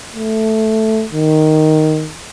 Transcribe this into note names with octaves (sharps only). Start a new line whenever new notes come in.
A3
D#3